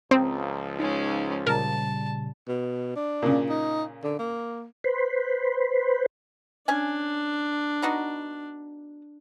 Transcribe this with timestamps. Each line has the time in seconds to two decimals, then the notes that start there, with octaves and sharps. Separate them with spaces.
0.11 C#2 F3 C4 A#5 D#6
0.79 G#3 C#4 D#4
1.47 A#2 C#3 G3 A#4 A5
2.48 B2
2.96 D4
3.23 A#2 C#3
3.49 D#4
4.04 D3
4.19 A#3
4.84 B4 C5
6.68 C#4 D4 G#5
7.82 B3 D#4 F#4